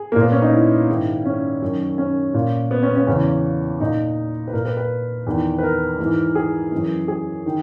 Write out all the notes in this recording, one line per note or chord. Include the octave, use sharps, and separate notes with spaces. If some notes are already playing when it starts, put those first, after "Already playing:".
Already playing: G#4
A#2 A#3
B3
C#4
D#4
E4
G#2 D#3
C#4
F#2 D#3
C#4
A#2
B3
C#4
C#4
E2 C#3 E3 C#4
A#2 D#4
B4
A#2 A#4
B4
B4
E2 D#3
B4
A#4
G#2 E3
G#4
F#2 E3
G#4
D#3